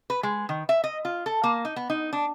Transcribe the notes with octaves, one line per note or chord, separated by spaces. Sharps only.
B4
G#3
D#3
E5
D#5
F4
A4
A#3
D#4
B3
D#4
D4